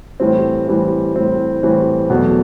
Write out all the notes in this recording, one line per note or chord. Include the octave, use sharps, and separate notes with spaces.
A2 E3 G3 C4
A2 E3 G3 C4
A2 E3 G3 C4
A2 E3 G3 C4
E2 B2 F#3 A3